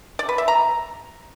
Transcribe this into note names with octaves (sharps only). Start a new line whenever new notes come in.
D5
B4
E5
A#5